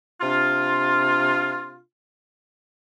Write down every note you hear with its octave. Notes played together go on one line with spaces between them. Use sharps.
C3 D4 F4